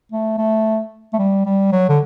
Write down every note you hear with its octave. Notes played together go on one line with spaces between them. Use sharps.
A3
A3
A3
G3
G3
F#3
D3